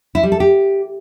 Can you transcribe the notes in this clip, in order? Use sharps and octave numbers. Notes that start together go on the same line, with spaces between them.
E4
G3
A4
G4